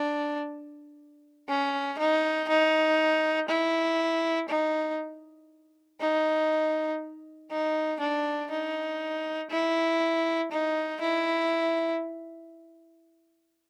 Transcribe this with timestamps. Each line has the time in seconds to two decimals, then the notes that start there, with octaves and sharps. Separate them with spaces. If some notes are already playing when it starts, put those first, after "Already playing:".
Already playing: D4
1.49 C#4
1.99 D#4
2.49 D#4
3.49 E4
4.49 D#4
6.01 D#4
7.51 D#4
8.00 D4
8.51 D#4
9.51 E4
10.52 D#4
11.01 E4